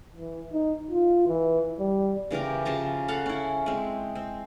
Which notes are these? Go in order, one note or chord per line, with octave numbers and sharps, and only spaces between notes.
E3
D#4
F4
E3
G3
C#3 E3 G4 A#4
C#3 F3 A5 A#5
A4 F5 F#5
C#4 E4
G#3 C4
C4